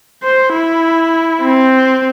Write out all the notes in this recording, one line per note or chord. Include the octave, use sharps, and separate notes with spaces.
C5
E4
C4